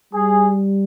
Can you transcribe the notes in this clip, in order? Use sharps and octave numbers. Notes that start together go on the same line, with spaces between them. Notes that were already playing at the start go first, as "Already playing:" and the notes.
G3 G#4